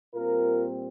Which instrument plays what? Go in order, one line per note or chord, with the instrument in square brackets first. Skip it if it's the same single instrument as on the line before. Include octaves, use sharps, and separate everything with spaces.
[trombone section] A#2 G3 C4 F4 A#4